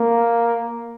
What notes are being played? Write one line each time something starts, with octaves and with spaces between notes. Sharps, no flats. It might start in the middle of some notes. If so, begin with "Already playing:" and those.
Already playing: A#3